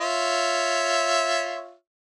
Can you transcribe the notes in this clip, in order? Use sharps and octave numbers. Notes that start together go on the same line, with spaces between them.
F4 C#5 E5